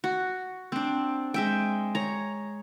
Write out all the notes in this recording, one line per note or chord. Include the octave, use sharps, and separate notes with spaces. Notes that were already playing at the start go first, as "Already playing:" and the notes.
F#4
C4 D4
G#3 E5 G5
C#5 A#5